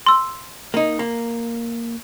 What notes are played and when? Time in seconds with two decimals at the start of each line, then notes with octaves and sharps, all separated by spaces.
0.06 C6 E6
0.74 A#3 D#4
0.99 A#3